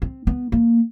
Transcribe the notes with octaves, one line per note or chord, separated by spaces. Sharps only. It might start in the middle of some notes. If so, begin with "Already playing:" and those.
C4
B3
A#3